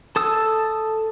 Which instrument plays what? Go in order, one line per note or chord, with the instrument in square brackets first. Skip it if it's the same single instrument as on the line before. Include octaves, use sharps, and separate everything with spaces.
[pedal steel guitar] A4 D#6 E6